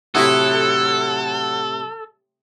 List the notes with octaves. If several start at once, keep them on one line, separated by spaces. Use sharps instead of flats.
A2 C3 F#3 E4 F#4 A4 D#6